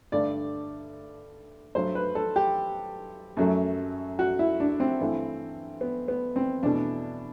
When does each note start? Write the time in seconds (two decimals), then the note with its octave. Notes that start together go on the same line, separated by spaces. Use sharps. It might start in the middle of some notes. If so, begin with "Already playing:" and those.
0.12 G2 D3 A3 D5
1.75 G2 F#3 A3 C5
1.95 B4
2.15 A4
2.36 G4
3.37 F#2 F#3 A3
4.19 F#4
4.39 E4
4.60 D4
4.80 C4
5.01 G2 E3 A3
5.81 B3
6.08 B3
6.36 C4
6.63 E2 B2 A3 D4